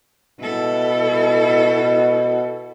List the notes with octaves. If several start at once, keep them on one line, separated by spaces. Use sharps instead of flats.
B2 E4 A4